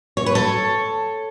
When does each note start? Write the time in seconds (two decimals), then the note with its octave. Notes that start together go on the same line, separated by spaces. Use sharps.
0.17 C#5
0.26 B4
0.35 A4 C#5